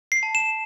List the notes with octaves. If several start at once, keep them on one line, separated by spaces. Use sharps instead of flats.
C7
A5
E7